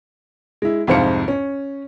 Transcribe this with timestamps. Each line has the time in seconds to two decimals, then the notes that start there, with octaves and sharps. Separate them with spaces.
0.62 G#3 E4
0.87 C2 F2 G#2 C5 F5 C#7
1.28 C#4